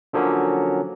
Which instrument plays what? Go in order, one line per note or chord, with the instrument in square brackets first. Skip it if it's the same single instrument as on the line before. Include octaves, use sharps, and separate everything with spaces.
[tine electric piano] D3 F3 F#3 A#3 C#4